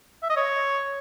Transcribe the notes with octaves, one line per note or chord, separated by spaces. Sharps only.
E5
D#5
C#5